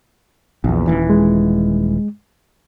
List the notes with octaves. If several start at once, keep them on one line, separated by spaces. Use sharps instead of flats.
A#1 E2
D#1 E3
G#3